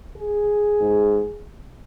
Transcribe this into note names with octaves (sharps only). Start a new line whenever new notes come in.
G#4
G#2